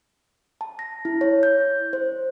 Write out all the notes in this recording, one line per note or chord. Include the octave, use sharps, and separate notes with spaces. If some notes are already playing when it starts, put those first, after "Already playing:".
A5
A#6
E4
C#5
G6
C5